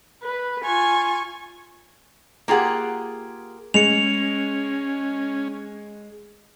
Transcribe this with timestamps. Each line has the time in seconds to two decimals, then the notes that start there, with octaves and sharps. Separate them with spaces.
0.23 B4
0.64 F4 G#5 C#6
2.48 A#3 F4 G4 G#4 F#5
3.74 G#3 C#4 C#7 F7